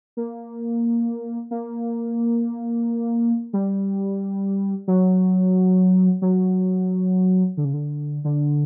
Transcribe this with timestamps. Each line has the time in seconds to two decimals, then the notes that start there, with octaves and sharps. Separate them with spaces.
0.17 A#3
1.51 A#3
3.53 G3
4.88 F#3
6.22 F#3
7.57 D3
7.65 C#3
7.73 D3
8.24 D3